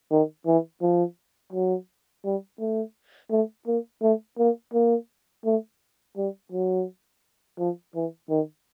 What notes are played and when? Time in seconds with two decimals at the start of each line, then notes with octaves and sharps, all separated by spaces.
0.11 D#3
0.47 E3
0.82 F3
1.53 F#3
2.25 G3
2.60 A3
3.31 A3
3.67 A#3
4.02 A3
4.38 A#3
4.73 A#3
5.45 A3
6.17 G3
6.52 F#3
7.59 F3
7.95 E3
8.30 D#3